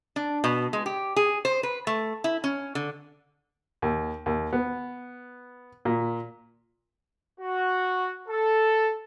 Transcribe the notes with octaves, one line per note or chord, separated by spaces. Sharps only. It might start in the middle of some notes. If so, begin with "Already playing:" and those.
D4
B2
G#3
G4
G#4
C5
B4
A3
E4
C#4
D3
D#2
D#2
B3
A#2
F#4
A4